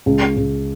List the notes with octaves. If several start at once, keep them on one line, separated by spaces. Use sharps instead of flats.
C#2
C#2